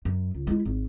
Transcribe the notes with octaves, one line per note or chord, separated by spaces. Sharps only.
F#2
C#2
G#3 E4
G#1